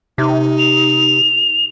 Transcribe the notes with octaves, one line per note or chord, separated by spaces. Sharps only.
C3 D#4
F7